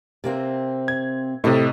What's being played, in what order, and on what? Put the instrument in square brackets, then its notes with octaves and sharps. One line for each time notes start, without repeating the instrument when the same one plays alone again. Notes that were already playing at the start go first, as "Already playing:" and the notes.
[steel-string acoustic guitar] C3 A#3 C4
[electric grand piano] G#6
[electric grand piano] A2 C3 [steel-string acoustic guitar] A4 D#5